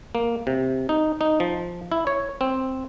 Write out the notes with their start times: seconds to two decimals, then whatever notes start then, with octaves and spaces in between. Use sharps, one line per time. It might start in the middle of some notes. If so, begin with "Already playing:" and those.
0.15 A#3
0.47 C3
0.89 D#4
1.21 D#4
1.40 F3
1.92 E4
2.07 C#5
2.41 C4